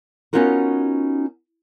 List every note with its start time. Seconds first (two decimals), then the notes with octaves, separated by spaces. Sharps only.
0.33 B3 C#4 D#4 F4 F#4 A#4